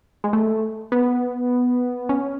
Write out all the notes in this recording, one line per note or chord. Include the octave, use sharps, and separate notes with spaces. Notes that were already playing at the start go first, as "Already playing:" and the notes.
G#3
A3
B3
C#4